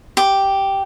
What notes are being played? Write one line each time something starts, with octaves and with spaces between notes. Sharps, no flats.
G4